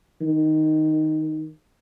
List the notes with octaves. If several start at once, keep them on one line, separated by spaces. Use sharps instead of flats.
D#3